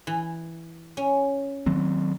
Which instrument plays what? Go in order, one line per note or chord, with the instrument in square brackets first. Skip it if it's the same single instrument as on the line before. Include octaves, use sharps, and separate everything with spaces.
[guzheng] E3
C#4
[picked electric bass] D#3 F#3 C4